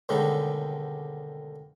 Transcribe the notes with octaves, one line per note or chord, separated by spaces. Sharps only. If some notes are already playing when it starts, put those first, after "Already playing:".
D#2 B2 D3 G3 G#3 C#4